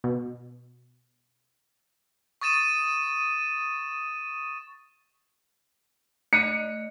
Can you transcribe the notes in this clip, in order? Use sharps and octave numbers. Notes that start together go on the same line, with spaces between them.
B2
C#6 D#6 A6 D#7 E7
A3 D#5 F#6 C#7 D#7